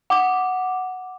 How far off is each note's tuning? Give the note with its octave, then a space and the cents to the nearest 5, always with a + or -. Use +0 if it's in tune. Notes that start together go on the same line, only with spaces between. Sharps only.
F#5 +0 D6 +0